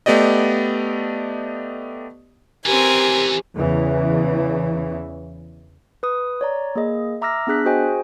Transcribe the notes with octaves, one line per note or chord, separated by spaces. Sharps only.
A3 B3 G4 D5 D#5
E3 C4 C#4 G4 A#4 G#5
E2 C#3 E3
B4 D#6
C#5 D5 A#5
A#3 G#4 D#5
E5 A#5 D6 E6 F6 A#6
B3 D4 G#4 F#6 B6
F#4 G#4 C5 D#5 G5 G#5